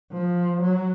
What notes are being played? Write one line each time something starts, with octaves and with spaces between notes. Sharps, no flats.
F3
F#3